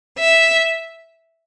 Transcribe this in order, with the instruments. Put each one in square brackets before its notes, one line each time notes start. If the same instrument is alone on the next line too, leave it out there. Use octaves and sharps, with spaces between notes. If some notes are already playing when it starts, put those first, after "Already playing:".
[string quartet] E5